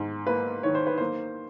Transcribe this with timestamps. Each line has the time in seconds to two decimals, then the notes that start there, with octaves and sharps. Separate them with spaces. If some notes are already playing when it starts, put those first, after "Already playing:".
Already playing: G#2
0.27 A#3 B4
0.63 D#3 C#5
0.75 C5
0.87 B4
0.98 A#3 C5